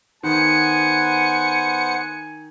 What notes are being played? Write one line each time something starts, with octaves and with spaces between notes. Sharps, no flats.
D#3 B3 C5 F#5 G#5 C#7